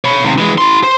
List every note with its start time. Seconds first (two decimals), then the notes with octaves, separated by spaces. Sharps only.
0.05 C#5 B5
0.24 D#2 C3
0.38 E3 G#3
0.58 E4 C6
0.83 C5